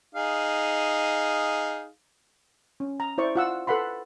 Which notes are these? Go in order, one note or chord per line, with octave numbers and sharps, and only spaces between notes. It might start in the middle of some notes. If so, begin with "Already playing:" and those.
D#4 G#4 F5
C#4
A#5
E4 C5 D5 C#6
F4 F#5 E6
A4 B4 F#5 B5 C6